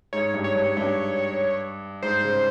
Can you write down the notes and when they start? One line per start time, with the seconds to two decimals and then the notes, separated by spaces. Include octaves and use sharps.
0.13 G#2 C#5
0.34 G2
0.44 C#5
0.55 G2
0.77 G2
2.03 G#2 C5
2.24 C#3